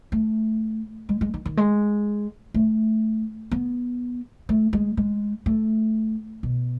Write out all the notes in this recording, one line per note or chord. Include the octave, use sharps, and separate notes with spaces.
A3
G#3
G#3
D#3
D#3
G#3
A3
B3
A3
G#3
G#3
A3
B2